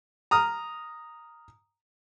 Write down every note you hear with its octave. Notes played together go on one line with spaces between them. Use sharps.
A#5 D#6 F6